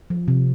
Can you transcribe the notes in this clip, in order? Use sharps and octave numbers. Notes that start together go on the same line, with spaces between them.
F3
C3